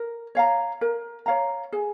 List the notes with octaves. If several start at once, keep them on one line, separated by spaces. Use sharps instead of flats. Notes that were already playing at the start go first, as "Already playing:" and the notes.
Already playing: A#4
C#5 F5 A#5
A#4
C#5 F5 A#5
G#4